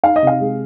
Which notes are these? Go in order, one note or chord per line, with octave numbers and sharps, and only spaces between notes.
D#4 F5
D#5
C3 F5
G#3